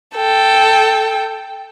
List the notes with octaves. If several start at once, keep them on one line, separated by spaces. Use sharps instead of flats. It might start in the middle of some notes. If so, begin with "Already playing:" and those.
A4 G5